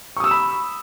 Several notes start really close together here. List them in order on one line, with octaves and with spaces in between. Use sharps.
C#6 D#6 E6 E7 B5